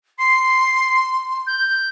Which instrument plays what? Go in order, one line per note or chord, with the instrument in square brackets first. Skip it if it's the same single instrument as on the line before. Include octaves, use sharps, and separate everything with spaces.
[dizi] C6 [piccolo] C7
[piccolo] G6